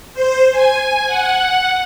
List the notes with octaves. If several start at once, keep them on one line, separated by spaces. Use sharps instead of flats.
C5
G#5
F#5